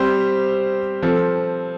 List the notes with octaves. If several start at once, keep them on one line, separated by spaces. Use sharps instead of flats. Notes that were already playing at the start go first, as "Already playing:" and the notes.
Already playing: G3 C4 G4 C5
F3 C4 A4